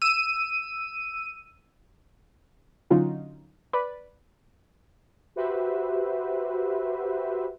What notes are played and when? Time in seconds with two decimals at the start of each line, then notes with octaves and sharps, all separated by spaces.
0.02 E6 D#7
2.91 D3 F#3 C#4 D#4 F4 F#4
3.73 B4 D5 B5
5.36 F#4 G4 B4 C5 E5